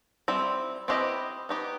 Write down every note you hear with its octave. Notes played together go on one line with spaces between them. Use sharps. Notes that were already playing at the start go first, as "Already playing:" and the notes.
G3 C4 E4
C4 E4 G4 B4 D#5
B3 D#4 G4